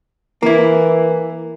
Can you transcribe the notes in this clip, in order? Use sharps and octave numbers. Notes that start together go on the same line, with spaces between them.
E3 A#3 E4